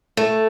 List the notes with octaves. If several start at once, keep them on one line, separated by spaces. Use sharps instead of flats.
A3